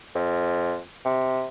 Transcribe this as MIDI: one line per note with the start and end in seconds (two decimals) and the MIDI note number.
0.15 0.78 41
1.05 1.47 48